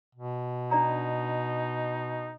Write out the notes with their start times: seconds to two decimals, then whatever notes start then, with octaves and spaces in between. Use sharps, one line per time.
0.15 B2
0.71 D4 D#4 D5 A#5